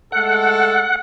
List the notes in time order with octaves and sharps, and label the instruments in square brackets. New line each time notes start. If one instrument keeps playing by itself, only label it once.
[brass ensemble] G#3 A3 A4 [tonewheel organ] F#5